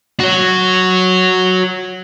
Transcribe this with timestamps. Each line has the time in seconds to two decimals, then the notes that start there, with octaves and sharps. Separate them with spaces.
0.20 F#4 C#5